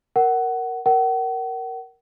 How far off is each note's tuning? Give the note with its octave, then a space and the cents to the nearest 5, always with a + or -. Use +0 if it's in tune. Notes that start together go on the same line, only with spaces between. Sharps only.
A#4 +0 F#5 +15
A#4 +0 F#5 +40